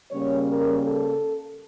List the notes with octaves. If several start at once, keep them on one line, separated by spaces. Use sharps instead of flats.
C#3 G3 A#3 C#4 C#5
A#4
A4